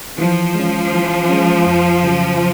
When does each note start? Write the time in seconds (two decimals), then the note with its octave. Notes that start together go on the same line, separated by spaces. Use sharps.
0.18 E3 F3
0.55 G#3 C#4
0.92 E3
1.29 G#3 C#4
1.66 F2
2.03 C#3 F#3